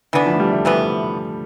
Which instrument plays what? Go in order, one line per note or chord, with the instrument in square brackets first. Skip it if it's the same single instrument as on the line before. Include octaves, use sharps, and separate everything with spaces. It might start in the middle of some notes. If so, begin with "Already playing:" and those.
[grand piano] D3 [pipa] E3 B3 D4
[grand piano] F3
A3
G3
A3
[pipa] C3 E3 B3 [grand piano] A3